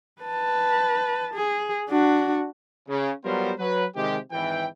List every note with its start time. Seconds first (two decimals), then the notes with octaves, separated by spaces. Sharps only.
0.22 B4 A5
1.34 G#4
1.89 D4 F#4
2.89 C#3
3.25 F#3 G3 B3 F4 A#4 C5
3.59 F#3 B4
3.96 C3 D#3 G#3 G4
4.32 G#1 E3 G5